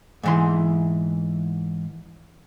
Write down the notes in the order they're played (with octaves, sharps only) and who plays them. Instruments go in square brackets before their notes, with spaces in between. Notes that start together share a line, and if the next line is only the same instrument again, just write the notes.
[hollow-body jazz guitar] G#2 E3 C6